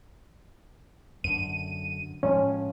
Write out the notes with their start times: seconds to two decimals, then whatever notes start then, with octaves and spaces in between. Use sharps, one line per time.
1.24 F#2 D3 D#7
2.23 A2 F3 G#3 C#4